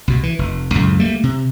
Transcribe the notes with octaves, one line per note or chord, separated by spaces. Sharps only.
C2 B2
E3
F1
C#2 F#2 A2
D2 G3 A3 A#3
C3